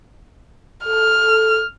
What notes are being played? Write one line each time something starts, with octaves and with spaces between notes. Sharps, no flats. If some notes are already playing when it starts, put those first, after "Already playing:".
A4 F6